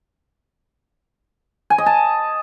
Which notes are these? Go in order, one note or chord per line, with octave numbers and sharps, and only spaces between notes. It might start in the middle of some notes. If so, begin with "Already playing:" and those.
G#5
D#5
A5